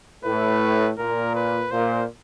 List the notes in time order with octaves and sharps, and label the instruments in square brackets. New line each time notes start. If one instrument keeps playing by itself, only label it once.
[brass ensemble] A2 [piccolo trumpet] B4
[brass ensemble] A#2 [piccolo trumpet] A#4
[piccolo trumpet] B4
[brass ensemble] A#2 [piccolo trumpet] C5